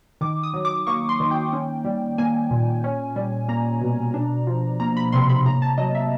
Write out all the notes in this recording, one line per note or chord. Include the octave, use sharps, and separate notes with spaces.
D#3 D6
D#6
F#3
D6
A#3 C#6
C6
D#3
G5
C#4
G3
A#3 G#5
A#2
C#4
G3
A#3 A#5
B2
D4
F3
A#3 A#5
B5
C3 C6
B5
A2 A#5
A5
F#3 D#5
E5